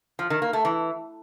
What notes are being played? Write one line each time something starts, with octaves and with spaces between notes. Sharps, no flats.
F3
D#3
A#3
A3
E3